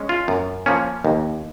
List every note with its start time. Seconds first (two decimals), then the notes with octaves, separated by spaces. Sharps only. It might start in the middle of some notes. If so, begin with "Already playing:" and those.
Already playing: G#3 C#4
0.09 F4
0.28 F#2
0.66 F3 A#3 C#4
1.05 D#2